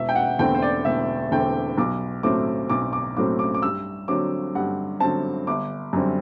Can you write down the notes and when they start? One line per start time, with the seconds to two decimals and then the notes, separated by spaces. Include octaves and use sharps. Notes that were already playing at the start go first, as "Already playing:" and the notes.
Already playing: E1 E5
0.09 G5
0.16 F#5
0.39 E2 D3 A3 C4 G5
0.55 C5
0.62 D5
0.85 E1 E5
1.31 E2 D3 A3 C4 G5
1.78 B1 D6
2.23 A2 F#3 A3 C4 D6
2.70 B1 D6
2.93 D6
3.17 A2 F#3 A3 C4 D6
3.39 D6
3.54 D6
3.62 G2 E6
4.08 D3 F#3 C4 D6
4.55 G2 F#5
5.00 D3 F#3 C4 A5
5.47 G1 D6
5.93 F#2 D3 G3 C4